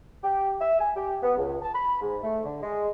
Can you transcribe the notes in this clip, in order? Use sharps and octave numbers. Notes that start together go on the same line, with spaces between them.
G4
E5
G#5
G4
B3
C#2
A5
B5
G#2
A3
D3
G#3